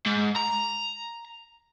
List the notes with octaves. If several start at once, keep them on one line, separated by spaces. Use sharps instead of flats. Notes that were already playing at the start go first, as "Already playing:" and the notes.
G#2
A#5